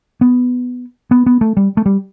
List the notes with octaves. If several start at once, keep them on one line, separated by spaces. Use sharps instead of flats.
B3
B3
B3
A3
G3
A3
G3